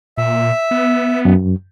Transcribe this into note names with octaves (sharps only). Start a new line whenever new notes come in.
A#2 E5
B3
F#2